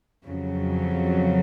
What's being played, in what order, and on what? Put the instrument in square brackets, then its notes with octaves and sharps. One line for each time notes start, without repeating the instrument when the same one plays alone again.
[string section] F2 C#3 F#3